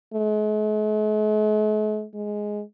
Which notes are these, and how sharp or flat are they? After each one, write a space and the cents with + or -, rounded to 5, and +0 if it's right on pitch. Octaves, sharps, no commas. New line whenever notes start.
G#3 +45
G#3 +5